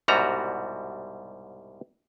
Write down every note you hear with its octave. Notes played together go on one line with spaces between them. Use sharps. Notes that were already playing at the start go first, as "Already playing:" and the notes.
C2 G#2 B2 G3 F#4 A#5